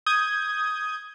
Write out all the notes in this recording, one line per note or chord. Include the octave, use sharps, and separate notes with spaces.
D#6 G6 G#6